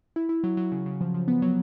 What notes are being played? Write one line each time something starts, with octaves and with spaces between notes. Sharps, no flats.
E4
E4
F#3
F#3
C#3
C#3
F3
F3
B3
F#3